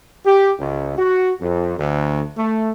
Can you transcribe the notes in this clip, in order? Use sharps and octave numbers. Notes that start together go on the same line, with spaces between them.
G4
C#2
F#4
F2
D2
A3